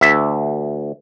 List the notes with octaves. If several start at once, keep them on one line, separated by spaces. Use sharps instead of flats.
D2 E5